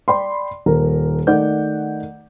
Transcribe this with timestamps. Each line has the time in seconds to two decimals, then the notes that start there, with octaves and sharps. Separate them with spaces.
0.08 D5 G5 B5 C6
0.66 D#1 A#4
1.27 D#3 A3 D5 F#5 G6